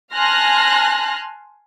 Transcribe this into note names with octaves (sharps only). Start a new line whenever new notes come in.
G#5 A5 C6 F6 F#6 A#6